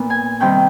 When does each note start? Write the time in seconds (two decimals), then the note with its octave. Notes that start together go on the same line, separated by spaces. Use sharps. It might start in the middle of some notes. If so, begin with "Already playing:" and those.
Already playing: A#2 B3
0.10 G#5
0.40 C3 D#3 G3 C4 G5